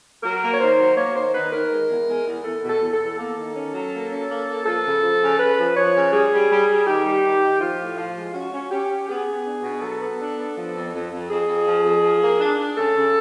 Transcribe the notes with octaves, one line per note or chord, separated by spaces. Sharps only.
F#3 A#4
A#3
C#5
D#3 C5
F#3
A#3 C#5
D#3 C5
D#3 B4
D#3 A#4
G#3
E2
G#3
E2
E2 A4
B2
A4
E2
A4
E2
A#3 A4
D#3
C#4
F#3
A#3
C#4
A#3
A#3
F3 A4
C#3
F3
C#3
C#3 B4
F3
F3 C#5
C#3
G3 G#4
G3
G3
G3
D#3 G4
G3
D#3
D#3
F3 F4
A2
F3 F4
G#3
C#4 F#4
C#4
C#4 G4
C#4
B3 G#4
B3
D4
B2
F#3 A4
B3
D4
B3
F3
F2
F2
F2
F2 G#4
F2
F3
F2
F3
A#3
D4
D4
C#3 A4
C#3